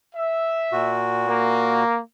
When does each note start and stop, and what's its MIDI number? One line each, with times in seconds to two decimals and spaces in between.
0.15 0.98 76
0.72 1.84 46
0.72 1.84 66
1.27 1.99 58